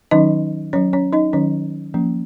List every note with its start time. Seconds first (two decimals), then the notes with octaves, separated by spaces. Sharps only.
0.11 D#3 F#3 C#4 D#4 D#5
0.73 F#3 C#4 C#5
0.93 C#4 C#5
1.13 D#4 D#5
1.33 D#3 F#3 C#4 C#5
1.94 F3 A#3 C#4